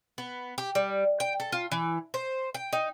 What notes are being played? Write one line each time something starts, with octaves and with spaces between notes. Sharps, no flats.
B3
G4
G3
G5
A4
F4
E3
C5
G5
D#4